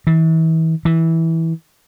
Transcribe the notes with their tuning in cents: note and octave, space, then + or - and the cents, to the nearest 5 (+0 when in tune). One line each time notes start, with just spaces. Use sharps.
E3 -35
E3 -15